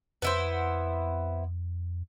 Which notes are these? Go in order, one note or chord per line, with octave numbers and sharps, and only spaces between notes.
F2 B3 E4 C5